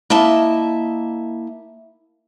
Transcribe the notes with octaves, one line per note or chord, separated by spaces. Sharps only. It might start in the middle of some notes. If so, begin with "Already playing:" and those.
A#3 E4 D#5 E5 A5